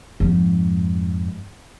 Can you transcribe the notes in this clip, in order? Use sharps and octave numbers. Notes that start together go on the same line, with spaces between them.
F2 G#2